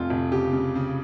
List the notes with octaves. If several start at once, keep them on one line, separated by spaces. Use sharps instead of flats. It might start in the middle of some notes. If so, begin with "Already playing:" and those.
Already playing: F1 F2 F4
F1
C#3 G4
C#3
C#3